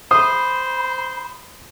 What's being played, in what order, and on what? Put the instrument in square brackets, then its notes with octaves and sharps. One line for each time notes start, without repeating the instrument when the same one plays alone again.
[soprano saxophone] C5 [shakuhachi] B5 [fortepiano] D#6